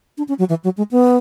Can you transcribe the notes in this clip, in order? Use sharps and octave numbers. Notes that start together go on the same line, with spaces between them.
D4
C#4
F#3
E3
F#3
G#3
B3